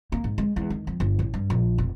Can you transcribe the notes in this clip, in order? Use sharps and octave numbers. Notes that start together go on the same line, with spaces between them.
A#3
G#2
G#3
E2
D#3
F2
G1
A1
G2
A#1
F1